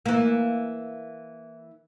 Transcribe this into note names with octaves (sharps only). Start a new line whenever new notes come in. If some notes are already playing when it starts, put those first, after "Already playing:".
E3 A#3